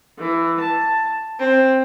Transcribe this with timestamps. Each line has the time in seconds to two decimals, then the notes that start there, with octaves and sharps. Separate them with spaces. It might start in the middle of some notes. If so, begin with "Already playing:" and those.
0.17 E3
0.60 A5
1.40 C4